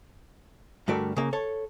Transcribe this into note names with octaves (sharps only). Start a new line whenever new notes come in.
G2 D3 A3 F#4 A#4 D5
C#3 A#3
A4 C#5